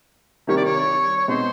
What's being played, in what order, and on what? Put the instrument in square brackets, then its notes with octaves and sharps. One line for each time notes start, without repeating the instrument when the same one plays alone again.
[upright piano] C3 D#3 G3 [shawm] C#5
[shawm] D5
C#5
C#5
[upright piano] B2 G#3 C4 D#4 [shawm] C5